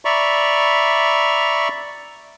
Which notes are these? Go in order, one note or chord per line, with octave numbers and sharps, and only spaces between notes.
D5 E5 A#5 B5 C#6